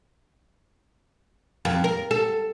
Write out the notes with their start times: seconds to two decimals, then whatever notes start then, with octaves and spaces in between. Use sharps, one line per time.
1.65 F2
1.84 A#4
2.11 A4